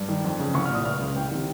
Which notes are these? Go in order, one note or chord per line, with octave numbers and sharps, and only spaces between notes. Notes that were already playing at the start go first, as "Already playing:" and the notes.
Already playing: G2
D#3
F2
C#3
C2 C#6
F6
A#2
D#6
C#2 F6
C#3
C2 G5
C3 D#3